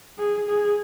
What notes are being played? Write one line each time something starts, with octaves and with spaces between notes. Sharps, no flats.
G#4
G#4